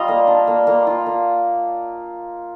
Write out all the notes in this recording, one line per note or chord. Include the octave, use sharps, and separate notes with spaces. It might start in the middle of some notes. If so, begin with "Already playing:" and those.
Already playing: G3 F4 D#5 A#5
A#3
D4
A#3
A#3
F4
A#3